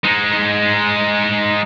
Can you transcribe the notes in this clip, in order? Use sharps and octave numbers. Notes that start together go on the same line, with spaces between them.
G#3 D#4